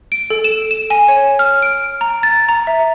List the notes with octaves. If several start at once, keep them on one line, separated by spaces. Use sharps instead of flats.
D7
A4
E7
E7
G#5
C#5
F6
D7
A#5
A6
A#5
E5